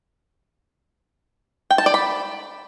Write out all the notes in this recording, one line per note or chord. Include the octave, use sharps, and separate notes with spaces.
G5
A5
D5
B5